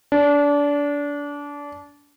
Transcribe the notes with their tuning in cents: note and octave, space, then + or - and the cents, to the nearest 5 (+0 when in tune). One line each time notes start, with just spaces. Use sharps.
D4 -25